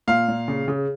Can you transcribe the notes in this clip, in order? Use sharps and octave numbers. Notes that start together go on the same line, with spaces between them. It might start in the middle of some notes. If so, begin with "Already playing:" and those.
A#2 F5
A#2
C#3
C#3